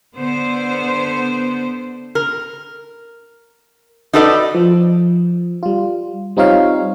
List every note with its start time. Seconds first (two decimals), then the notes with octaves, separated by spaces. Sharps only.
0.15 D3 B3 C5
2.15 A#4
4.13 D#4 F#4 A4 B4 D5 D#5
4.55 F3
5.63 G3 F4
6.37 G3 C4 D#4 F4 C#5 F5